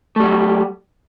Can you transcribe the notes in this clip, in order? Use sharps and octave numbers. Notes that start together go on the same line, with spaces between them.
F#3 G3 A3